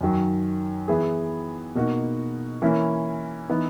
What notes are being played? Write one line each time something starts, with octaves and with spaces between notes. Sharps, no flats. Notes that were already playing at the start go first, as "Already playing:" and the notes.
F#2 D#3 F#3
E3 B3 E4 G#4
B2 A#3 D#4 F#4
E3 A#3 C#4 E4
E3 B3 D#4